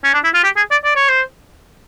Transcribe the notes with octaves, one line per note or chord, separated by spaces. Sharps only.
C#4
D4
E4
F4
G4
G#4
D5
D5
C#5
C5